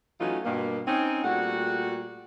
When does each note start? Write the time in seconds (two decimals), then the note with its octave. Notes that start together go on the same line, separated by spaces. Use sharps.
0.20 E3 F#3 A3 C#4 D#4 F4
0.45 G2 B2 A#3
0.88 C4 C#4 D#4
1.24 A#2 G3 A3 F#4 F#5